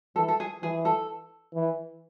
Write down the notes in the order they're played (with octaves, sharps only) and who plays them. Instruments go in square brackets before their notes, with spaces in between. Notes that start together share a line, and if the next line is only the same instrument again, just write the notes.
[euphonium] E3 [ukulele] A4
[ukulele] A4
G#4
[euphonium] E3 [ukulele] G#4
[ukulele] A4
[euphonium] E3